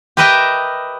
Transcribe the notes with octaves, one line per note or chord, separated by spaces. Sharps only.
G4 A#4 B4 D#5 E5 G5